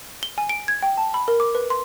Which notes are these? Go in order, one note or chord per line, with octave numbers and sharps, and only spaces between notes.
G7
G#5
D7
G#6
G5
A5
B5
A#4
D6
B4
C6